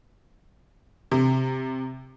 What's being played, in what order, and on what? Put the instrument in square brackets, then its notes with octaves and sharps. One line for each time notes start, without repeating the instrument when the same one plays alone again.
[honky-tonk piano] C3